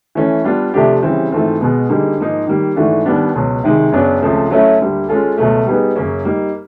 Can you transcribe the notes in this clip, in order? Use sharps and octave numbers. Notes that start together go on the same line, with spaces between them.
E3 A3 C#4
G3 B3 D4 F4
C3 F3 A3 D4 G4
C#3 E3 G3 C4
G#2 E3 A3 C4 F4
B2 G#3 B3
D3 G3 A#3 D#4 G#4
G#2 F3 A#3 D#4
D#3 G3 A#3
G#2 E3 A3 D4 F#4
D#2 D#3 G3 B3 D4
C#2 B2 F#3
C3 D#3 G#3
F#2 C#3 F#3 B3 D4
C#2 C#3 F3 A3 C4
F#3 A3 C#4 E4
D2 D3 G3 A#3
G#3 C#4 F4 A4
C#2 B2 F#3 A3
G3 B3 D#4 G#4 B4
F#2 C#3 F#3 A#3 C#4
G3 A#3 D#4